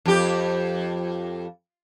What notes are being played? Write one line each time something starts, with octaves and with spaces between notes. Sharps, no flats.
F2 G4